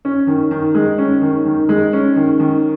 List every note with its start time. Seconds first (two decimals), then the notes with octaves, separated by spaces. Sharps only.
0.05 C#4
0.27 D#3
0.51 D#3
0.75 G#3
0.98 C#4
1.22 D#3
1.45 D#3
1.69 G#3
1.93 C#4
2.16 D#3
2.40 D#3